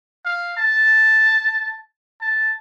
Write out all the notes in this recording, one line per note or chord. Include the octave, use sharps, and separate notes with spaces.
F5
A5
A5